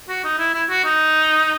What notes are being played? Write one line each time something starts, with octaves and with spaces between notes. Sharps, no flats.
F#4
D#4
E4
E4
F#4
D#4